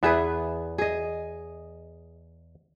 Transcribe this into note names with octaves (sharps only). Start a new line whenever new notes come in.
E2 B3 E4 G#4 B4 E5
G#4 D#5